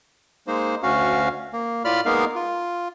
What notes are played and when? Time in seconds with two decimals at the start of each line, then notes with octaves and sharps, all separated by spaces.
0.47 G#3 A#3 D#4 C5
0.83 D2 C#4 F#4 F5
1.53 A#3
1.85 A2 F4 D5 B5 F6
2.05 G#3 A#3 B3 D#4 A#4 F5
2.36 F4